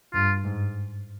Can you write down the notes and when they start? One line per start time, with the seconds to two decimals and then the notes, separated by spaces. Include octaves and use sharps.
0.14 G2 F4
0.44 G#2